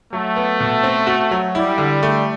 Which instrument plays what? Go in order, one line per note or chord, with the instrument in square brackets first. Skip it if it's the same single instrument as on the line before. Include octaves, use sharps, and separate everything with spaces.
[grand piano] F#3 [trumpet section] A3
[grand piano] B3
B2
C4
F#4
F#3
[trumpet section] G3 [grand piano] E4
[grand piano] D3
A3